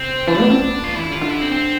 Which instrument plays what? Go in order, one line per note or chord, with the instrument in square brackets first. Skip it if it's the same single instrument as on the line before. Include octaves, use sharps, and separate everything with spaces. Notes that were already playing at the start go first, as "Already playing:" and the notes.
Already playing: [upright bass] C3 [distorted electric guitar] C4
[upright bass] E3 [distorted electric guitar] D4
[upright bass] B3
C4
C4
B3
A3
[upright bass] G3 [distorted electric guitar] F4
[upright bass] E3 [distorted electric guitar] E4
[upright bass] D3
[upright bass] C3 [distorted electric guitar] F4
[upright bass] D3
[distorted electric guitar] E4
C4
C4